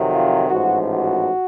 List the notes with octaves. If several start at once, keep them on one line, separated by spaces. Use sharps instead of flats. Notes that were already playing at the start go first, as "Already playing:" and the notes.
Already playing: F2 C3 D#3 F#3
F4
A1 G#2 F3 F#4
F#4